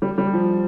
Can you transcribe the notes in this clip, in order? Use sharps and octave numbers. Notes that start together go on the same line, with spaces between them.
G3
G3
F3